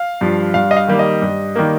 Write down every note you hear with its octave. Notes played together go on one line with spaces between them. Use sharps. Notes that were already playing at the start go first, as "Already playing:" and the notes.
Already playing: F5
G2 F3
G2 F5
D#5
F5
D#3 G3 A#3
D#5
G2
D#3 G3 A#3